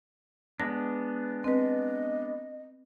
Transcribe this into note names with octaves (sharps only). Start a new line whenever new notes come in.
G#3 B3 D4 A#6
C4 B4 D#5